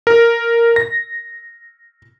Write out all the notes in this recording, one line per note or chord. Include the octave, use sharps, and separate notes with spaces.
A#4
A#6